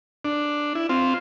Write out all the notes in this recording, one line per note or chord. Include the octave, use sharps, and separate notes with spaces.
D4
E4
C4 F4